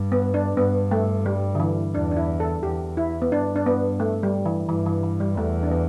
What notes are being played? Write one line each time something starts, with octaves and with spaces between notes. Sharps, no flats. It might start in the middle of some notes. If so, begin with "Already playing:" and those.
Already playing: G2
B3
D4
G2 B3
A3
G3
D3
E3
E2 D4
D4
E4
A4
E2 G4
E4
B3
G2 D4
D4
B3
A3
G3
E3
G2 E3
E3
E3
G3
E2 A3
D4
B3